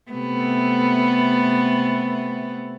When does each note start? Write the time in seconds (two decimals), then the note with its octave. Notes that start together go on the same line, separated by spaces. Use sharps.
0.12 C3 A3 B3